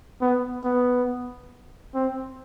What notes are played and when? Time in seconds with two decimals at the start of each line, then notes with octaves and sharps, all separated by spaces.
0.21 B3
0.64 B3
1.95 C4